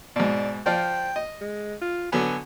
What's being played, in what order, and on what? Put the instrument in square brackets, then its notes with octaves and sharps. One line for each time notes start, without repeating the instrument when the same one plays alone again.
[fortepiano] G#2 B2 [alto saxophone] D5
[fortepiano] F3 D5 F5 [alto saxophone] G5
[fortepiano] D#5
[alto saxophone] G#3
F4
[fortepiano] D3 F#3 B3 [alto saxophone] G#5